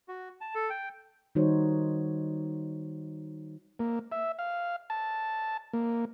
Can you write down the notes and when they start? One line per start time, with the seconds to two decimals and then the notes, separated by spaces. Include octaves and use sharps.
0.08 F#4
0.41 A5
0.55 A4
0.70 G5
1.35 D#3 G3 D#4 F#4 C5 C#5
3.79 A#3
4.12 E5
4.39 F5
4.90 A5
5.73 A#3